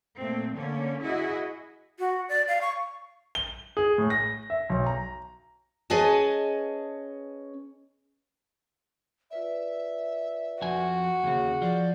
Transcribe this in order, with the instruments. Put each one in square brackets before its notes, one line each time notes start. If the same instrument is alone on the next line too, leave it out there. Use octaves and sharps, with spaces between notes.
[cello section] A#2 A3 C4
D3 A#3 C#4
E4 F#4 G#4 D#5
[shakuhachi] F#4
D5
F5
C#6
[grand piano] G7
G#4
A2
A#6
E5
B1
A#5
[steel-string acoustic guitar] C#4 G#4 B4 D#5 G#5 A5
[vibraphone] F4 B4 D5 [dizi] E5
[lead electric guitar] F2 G#5 [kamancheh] F#4
[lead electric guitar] D#2 C#3 [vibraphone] G#4
[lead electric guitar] F3 [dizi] D5